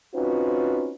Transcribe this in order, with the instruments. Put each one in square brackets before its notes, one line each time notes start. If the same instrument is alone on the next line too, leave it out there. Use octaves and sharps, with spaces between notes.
[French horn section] C4 C#4 D#4 F4 F#4 B4